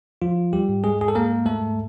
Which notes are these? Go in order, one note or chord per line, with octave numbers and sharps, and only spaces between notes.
F3 F4
G3 G4
G#2
G#3 G#4
G#4
A4
G#3 A#3 A#4
A3 A4
G#2